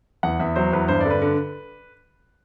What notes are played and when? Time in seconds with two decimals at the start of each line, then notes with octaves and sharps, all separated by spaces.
0.23 E2 F#5
0.40 E2 E5
0.56 F#3 C5
0.73 E2 B4
0.88 G2 C5
1.01 D3 D5
1.10 B4
1.22 D3